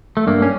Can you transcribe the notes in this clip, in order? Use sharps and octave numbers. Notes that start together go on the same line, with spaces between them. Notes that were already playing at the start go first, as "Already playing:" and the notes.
A3
G2 A#3
C#4